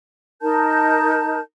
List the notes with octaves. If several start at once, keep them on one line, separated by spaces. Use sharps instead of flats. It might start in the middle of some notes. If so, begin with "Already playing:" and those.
D#4 A#4 A5 G6